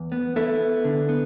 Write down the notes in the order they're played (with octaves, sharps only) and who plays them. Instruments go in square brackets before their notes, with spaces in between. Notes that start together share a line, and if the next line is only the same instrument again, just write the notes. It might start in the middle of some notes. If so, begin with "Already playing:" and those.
Already playing: [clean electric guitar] E2
B3
B3 E4 A4
B3
D3
B3